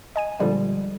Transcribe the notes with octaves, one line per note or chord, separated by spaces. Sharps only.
D#5 G#5 D#7
A#2 D3 F3 G3 G#3